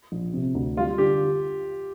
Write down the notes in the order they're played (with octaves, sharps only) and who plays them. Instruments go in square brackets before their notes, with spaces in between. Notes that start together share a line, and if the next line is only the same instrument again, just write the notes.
[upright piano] A#1
C3
D2
[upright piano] G3 [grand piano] F4
[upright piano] D3 [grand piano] G4